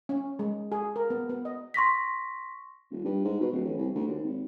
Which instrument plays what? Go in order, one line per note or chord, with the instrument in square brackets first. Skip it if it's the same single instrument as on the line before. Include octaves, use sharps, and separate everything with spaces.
[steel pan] C#4
G#3
G#4
A#4
B3
B3
D#5
[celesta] C6 C#6 A#6 B6
[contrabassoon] D#1
G2
G#2
B2
D1
A1
C2
D2
D#2
G#1